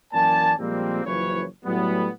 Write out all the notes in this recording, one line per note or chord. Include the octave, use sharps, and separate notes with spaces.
F#2 E3 A#3 D5 G#5 A5
A#2 F3 G3 G#3 A#3 C4
F#1 F#2 E3 F3 B4 C#5
A2 F#3 G3 A3 B3